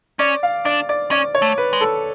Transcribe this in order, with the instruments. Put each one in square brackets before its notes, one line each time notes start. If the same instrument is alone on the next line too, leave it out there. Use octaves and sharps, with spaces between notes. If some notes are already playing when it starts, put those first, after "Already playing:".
[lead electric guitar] C#4 [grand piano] D5
[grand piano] F5
[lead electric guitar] D4 [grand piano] D5
[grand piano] D5
[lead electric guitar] C#4 [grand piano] D5
[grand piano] C#5
[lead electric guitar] A3
[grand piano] B4
[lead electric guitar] G#3
[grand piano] A4